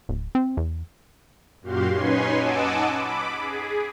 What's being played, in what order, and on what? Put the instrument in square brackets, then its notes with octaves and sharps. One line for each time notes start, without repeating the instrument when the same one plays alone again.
[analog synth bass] D1
C4
E2
[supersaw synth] F#2 A#2 F#4 G4 F5 C6
C#4 D#4 B4 C#5 G#5 C6
D#5 F#5 G#5 A5 D6 E6
B5 D6
G#4